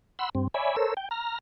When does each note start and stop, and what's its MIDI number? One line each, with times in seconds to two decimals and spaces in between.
0.19 0.30 78
0.19 0.30 83
0.19 0.30 84
0.19 0.30 88
0.35 0.48 43
0.35 0.48 60
0.54 0.76 73
0.54 0.76 74
0.54 0.76 76
0.54 0.76 80
0.54 0.76 83
0.76 0.94 69
0.76 0.94 70
0.76 0.94 72
0.76 0.94 73
0.76 0.94 88
0.97 1.09 79
1.11 1.39 82
1.11 1.39 89